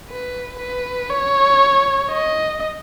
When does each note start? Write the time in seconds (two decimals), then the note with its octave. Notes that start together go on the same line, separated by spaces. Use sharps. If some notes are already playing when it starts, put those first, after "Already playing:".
0.09 B4
0.60 B4
1.10 C#5
2.10 D#5